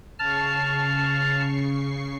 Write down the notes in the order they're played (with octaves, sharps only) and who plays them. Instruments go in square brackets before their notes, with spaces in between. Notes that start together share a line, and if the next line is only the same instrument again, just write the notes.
[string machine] C#3 C#6 C7 [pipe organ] A5 F6